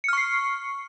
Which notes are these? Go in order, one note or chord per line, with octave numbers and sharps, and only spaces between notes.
C#6 F6 C7 C#7